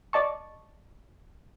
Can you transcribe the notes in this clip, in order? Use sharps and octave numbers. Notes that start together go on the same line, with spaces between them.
D5 D#5 A5 C#6